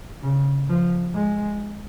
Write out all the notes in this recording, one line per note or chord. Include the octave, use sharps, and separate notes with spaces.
C#3
F3
G#3